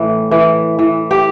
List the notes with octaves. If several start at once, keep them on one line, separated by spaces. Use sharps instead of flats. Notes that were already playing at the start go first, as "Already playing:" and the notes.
Already playing: A2 E3
E3
E3
G4